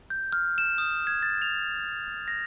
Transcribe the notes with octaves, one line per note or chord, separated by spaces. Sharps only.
G6
F6
E7
D#6
G#6
A6
F7
A#6